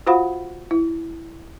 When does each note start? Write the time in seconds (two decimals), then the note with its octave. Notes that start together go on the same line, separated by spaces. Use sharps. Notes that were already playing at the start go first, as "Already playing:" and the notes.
0.07 F4 F#4 C5 F5 F#5 B5
0.71 E4